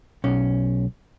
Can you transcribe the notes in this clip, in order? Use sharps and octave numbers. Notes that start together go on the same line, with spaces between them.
B1 C#4